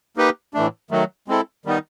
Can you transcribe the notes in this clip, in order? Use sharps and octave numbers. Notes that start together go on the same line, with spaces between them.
A#3 D#4 G4 B4
A2 E3 A3 D4
D#3 F#3 A3
G#3 C4 E4 A4
D#3 G3 B3 D#4